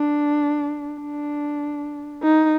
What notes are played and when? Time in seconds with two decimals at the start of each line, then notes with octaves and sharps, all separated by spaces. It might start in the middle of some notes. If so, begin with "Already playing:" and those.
Already playing: D4
1.02 D4
2.23 D#4